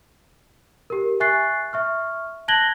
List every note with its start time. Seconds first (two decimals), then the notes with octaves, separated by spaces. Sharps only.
0.90 G4 A#4
1.20 E5 G#5 C#6 F#6 A6 C7
1.73 E5 C#6 F6
2.48 A5 F#6 G#6 A#6 F#7 G7